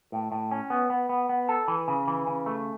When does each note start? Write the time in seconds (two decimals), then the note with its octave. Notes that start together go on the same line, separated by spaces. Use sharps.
0.12 A2
0.32 A2
0.51 C#4
0.70 B3
0.90 B3
1.09 B3
1.29 B3
1.49 A4
1.68 E3
1.88 C#3
2.08 E3
2.27 C#3
2.46 A3